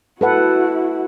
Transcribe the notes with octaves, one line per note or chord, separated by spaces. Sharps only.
E4 F#4 A4 B4 F#5